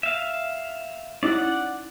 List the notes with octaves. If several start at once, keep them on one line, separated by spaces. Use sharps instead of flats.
E5 F5
C#4 D#4 E4 D5 F#5